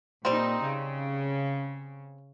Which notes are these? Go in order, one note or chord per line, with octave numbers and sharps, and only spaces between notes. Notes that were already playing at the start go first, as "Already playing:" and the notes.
A#2 G3 C4 D#4
C#3